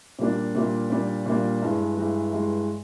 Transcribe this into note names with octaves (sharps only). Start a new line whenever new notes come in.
A#2 G3 A#3 D4
A#2 G3 A#3 D4
A#2 G3 A#3 D4
A#2 G3 A#3 D4
G2 E3 G#3
G2 E3 G#3
G2 E3 G#3